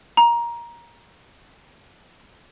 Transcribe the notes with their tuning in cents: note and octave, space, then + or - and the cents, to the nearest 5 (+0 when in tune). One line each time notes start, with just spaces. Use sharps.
A#5 +15